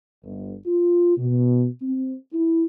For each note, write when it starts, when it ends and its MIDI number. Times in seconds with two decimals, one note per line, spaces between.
0.24 0.53 31
0.66 1.16 65
1.17 1.65 47
1.82 2.16 60
2.33 2.64 64